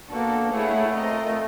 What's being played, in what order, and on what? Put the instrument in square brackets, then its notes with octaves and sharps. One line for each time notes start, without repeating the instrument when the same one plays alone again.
[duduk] A#3 [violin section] B3 D4 F#4 A4
[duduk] A3 [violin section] E4 G#4 C#5 F#5
[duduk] A3
[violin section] C4 F4 A#4 D#5